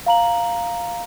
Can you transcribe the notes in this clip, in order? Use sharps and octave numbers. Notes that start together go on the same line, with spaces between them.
F5 A#5 F#7